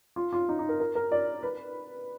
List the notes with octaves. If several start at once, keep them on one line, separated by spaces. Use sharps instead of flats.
F4
F4
D#4
D#4
A#4
A#4
A#4
D5
B4